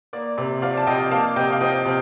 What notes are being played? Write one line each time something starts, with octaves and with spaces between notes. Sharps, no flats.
A#3 D5
C3
F3 D5 F5
A5
C3 D#5 G5
A#3 F5 A5
C3 D#5 G5
F5
F3 D#5 G5
C3